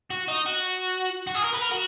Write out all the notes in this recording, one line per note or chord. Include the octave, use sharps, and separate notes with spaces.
F#4
D#4
F#4
F#4
G#4
A#4
B4
A#4
F#4